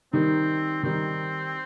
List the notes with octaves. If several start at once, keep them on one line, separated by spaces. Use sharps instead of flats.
D#3 G3 C4 D#4
D#3 G3 C4 D#4